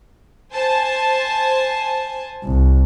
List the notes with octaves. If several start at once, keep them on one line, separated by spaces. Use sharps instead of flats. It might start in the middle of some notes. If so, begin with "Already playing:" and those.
C5 G#5 A5
C2